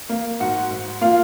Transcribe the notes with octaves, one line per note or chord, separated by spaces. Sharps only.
A#3
G#2 F#4 F#5
G#2
A#3 F4 F5